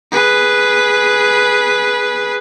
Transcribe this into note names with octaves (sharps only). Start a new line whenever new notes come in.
G#4 B4